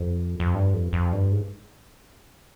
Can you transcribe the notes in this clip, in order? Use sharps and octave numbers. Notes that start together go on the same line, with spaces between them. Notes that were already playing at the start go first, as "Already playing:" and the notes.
Already playing: F2
F2
G2
F2
F2
G2
G#2